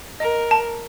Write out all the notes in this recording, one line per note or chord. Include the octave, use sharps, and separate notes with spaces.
A#4 D#5
A5